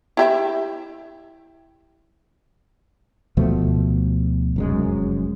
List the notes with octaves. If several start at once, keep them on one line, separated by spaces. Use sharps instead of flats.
E4 G4 E5
D2 B2 F3 A3
F1 F#2 G#3